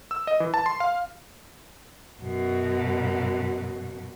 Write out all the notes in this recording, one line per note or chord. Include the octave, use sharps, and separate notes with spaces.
E6
D#5
E3
A5
C6
F5
F#2 B2